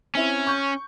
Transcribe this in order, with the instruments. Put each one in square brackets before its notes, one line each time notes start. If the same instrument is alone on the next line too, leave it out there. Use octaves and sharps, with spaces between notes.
[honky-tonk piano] C4 E4 [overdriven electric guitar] C#4
[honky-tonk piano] C#6 G6